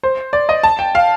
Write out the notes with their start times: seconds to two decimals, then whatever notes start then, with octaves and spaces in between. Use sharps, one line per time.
0.03 C5
0.33 D5
0.49 D#5
0.63 A5
0.79 G5
0.95 F5